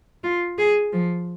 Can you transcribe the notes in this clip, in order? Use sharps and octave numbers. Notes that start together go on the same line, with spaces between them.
F4
G#4
F3